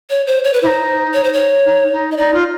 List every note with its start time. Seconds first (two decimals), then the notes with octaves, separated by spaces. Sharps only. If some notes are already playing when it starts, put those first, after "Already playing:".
0.10 C#5
0.27 C5
0.44 C#5
0.53 B4
0.62 E4 C5
0.67 D#4
1.14 C#5
1.24 C5
1.33 C#5
1.66 D#4
1.92 D#4
2.12 D#5
2.17 D#4 D5
2.34 F4